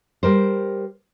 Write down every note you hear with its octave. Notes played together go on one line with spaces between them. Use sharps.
G3 A#4 C5